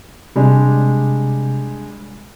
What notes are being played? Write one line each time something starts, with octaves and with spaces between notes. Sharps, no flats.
C3 G3 G#3 D4